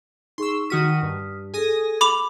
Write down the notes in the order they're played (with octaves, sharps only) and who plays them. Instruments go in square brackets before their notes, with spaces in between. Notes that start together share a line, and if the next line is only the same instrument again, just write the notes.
[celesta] D#4 G#4 C#6 [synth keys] C6 E6
[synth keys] D#3 F#4 D#7 [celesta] D#6 F6 B6
[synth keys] G2
[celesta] G#4 A4 [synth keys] G#5 D#6 A#6
[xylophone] B5 D6 F7